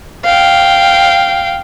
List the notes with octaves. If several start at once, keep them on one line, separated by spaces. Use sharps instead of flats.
F5 G5